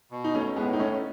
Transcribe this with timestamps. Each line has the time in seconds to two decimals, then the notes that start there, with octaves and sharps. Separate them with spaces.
0.11 B2
0.24 D#4
0.35 A3 C#4
0.56 A2 G#3 B3
0.73 D#4
0.79 A3 C#4